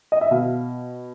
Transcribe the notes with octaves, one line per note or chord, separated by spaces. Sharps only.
D#5
E5
B2 F5